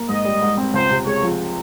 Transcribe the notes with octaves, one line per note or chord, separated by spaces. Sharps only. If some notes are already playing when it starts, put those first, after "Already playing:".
Already playing: A#3
G#2 D#5
G3
G#2
C4
C#2 C5
C3
G#3 C#5
F3